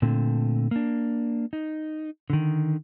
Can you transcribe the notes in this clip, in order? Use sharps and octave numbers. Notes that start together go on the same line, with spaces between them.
A#2 D3 A3 C4
A#3 D4
D#4
D3 D#3